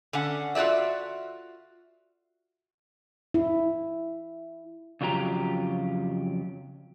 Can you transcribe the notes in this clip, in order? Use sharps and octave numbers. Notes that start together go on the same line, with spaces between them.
D3 C#4 F#5
F4 F#4 G#4 D5 E5
E4
F2 C#3 F#3 F4 G4 A#5